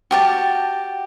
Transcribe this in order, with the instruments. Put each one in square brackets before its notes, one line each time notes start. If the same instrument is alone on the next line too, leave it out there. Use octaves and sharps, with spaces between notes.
[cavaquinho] F#4 G4 A5